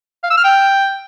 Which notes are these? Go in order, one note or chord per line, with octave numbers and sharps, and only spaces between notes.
F5
E6
F6
G5